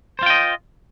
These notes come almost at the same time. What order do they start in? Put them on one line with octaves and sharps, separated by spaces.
C5 F4 G5 D#5